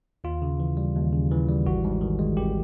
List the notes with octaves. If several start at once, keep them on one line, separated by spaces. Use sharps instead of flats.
D#2 F4
C#3
E3
G3
D#2
C#3
E3
G3
G#1 F#4
G#2
D#3
G#3
G#1 G4